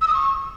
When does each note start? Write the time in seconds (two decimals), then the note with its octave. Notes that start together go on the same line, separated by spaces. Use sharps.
0.01 E6
0.08 D#6
0.14 C#6